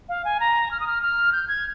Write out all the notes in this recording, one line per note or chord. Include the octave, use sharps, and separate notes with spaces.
F5
G#5
A#5
F6
D#6
F6
F6
G6
G#6